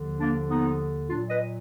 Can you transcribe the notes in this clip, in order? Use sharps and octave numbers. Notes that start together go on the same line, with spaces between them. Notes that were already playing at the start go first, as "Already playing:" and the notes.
Already playing: D#2 D3 F3
A#3 D4
B3 D#4
A#2 F#3 D4 F4
B4 D#5